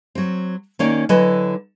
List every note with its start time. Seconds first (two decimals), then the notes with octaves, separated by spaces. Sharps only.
0.15 F#3 C4
0.79 D#3 A#3 C#4 C#5 D5
1.09 D3 F#3 E4 B4 D#5 G#5